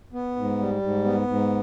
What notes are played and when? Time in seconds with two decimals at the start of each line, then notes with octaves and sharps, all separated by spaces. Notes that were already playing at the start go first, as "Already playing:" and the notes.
0.13 B3
0.36 G#2
0.59 G3
0.82 G#2
1.05 B3
1.27 G#2